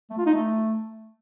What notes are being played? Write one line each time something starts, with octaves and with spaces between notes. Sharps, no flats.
A3
F4
D#4
A3